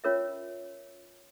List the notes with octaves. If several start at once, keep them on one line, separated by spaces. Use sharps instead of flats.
C#4 F4 A#4 C#5 E5